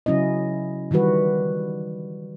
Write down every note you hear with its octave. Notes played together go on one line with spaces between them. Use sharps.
C#3 F#3 C#4 E4 D#5
D#3 E3 G3 F#4 B4